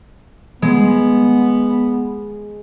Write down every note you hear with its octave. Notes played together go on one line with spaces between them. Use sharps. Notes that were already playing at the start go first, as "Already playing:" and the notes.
G#3 B3